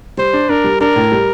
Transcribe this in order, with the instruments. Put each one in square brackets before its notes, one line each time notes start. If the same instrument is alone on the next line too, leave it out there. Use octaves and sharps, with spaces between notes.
[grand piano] G3 [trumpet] C5
[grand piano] D4
[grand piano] D4 [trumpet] A#4
[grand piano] G3
[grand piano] D4 [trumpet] A#4
[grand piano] A2
G3